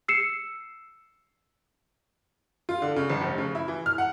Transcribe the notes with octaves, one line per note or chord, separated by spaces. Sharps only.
E6 C7 C#7 E7
F4
D3
C#3
G1
F1
C#3
E4
E3
F6
F#5